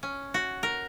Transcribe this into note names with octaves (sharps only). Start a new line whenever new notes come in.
C#4
F#4
A#4